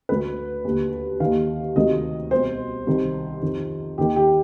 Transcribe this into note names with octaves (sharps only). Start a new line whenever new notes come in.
D2 D3 B4
D#2 D3
D#2 D#3 F5
D2 C3 D#3 D#5
C2 B2 C5
C2 C3 D#3
F2 D#3
D#2 D#3 G4
G4